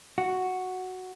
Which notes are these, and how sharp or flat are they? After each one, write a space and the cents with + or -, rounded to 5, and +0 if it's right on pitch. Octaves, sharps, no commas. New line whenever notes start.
F#4 +0